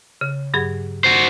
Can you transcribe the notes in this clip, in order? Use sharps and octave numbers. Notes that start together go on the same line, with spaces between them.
C#3
G2 F#3 G#4
F#4 C5